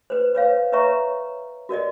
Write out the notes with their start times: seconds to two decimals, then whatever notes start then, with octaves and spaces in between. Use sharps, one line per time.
0.10 B4 C5
0.35 B4 C#5 F5
0.72 B4 C#5 E5 A#5 C#6
1.69 F#4 A#4 D5 D#5